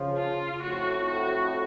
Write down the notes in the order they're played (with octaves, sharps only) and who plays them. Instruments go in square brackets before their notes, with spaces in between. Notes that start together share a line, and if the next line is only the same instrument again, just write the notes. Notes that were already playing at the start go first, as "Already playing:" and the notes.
Already playing: [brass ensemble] C#3 F3
[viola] F4
[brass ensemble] F2 A2 [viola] F#4
[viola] F#4